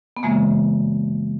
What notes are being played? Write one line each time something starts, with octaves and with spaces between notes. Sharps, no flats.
B3
F#2 C#3 E3 G#3 A#3